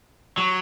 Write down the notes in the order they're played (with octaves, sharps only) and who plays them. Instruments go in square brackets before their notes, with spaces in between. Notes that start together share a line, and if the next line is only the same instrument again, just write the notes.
[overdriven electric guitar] F#3